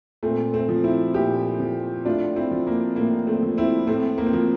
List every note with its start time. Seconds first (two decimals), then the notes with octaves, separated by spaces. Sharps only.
0.23 A#2 A3 C4
0.54 A3 C4
0.69 F3
0.84 C4 E4
1.14 A#2 E4 G4
1.60 F3
2.05 A2 D4 F4
2.36 C4 E4
2.51 F3
2.67 A#3
2.96 A2 A#3
3.27 A3 C4
3.43 F3
3.58 C4 E4
3.87 A2 A3 C4
4.18 A#3
4.26 C4
4.33 F3 A#3